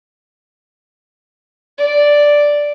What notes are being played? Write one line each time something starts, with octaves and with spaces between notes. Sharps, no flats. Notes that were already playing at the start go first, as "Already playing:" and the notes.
D5